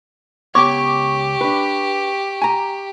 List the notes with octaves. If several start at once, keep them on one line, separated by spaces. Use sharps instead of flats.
C#2 B3 G4 C#5 C#6 D6
D4 B4
G#5 A#5